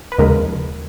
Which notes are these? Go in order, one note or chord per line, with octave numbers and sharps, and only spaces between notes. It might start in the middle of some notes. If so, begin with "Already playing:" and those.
B4
D#2 C#3 F3 G#3 A#4